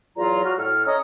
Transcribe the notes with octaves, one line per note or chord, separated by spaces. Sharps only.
E2 F#3 F4 D5 A#5
F#3 F#4 F6
A2 A4 F6
C#4 C#5 D#5 A#5 D#6